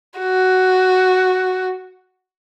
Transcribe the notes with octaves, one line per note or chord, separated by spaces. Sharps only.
F#4